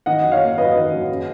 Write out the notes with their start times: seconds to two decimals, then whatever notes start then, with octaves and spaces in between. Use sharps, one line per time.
0.06 D#3 D#5 F#5
0.23 F#2
0.32 C#5 F5
0.41 A#3
0.58 F#2 B4 D#5
0.75 D#3
0.92 F#2
1.09 C#3